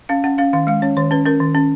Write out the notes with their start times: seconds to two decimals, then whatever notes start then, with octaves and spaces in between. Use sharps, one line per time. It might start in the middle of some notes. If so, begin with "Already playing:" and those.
0.09 C#4 F5
0.24 C#4 F#5
0.38 C#4 F5
0.53 D#3 F5
0.67 G#3 F5
0.82 C#4 C#5
0.97 D#3 C#5
1.11 C#4 B4
1.26 C#4 A#4
1.40 D#3
1.55 C#4